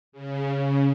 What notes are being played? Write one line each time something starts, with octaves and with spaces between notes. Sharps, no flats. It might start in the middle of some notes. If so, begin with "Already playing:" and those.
C#3
C#3